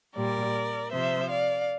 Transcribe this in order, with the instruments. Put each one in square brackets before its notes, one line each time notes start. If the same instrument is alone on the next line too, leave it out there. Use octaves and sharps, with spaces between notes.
[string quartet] A#2 G3 A#4 D5
C3 F3 C5 E5
D5 F5